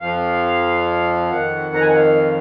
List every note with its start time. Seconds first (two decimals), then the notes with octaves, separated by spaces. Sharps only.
0.01 F2 F3 F5
1.31 F2 D#3 F#5
1.75 A#5
1.81 G#5
1.89 F#5
1.95 F5